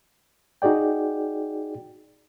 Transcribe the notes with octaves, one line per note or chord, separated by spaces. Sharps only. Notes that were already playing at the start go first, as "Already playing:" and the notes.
D#4 F#4 G#4 D5 G5